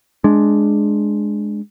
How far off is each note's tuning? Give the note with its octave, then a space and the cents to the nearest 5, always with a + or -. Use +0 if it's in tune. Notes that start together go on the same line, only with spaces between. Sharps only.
G#3 +10 D4 +0